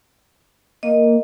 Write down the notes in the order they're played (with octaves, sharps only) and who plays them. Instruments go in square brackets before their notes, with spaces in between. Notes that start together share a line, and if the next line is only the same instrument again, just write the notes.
[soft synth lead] A#3 [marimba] D#5